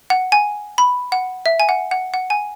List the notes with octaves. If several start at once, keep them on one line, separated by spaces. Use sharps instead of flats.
F#5
G#5
B5
F#5
E5
G#5
F#5
F#5
F#5
G#5